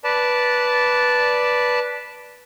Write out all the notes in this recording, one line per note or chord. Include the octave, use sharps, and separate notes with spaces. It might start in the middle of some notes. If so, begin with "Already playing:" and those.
B4 D5 A5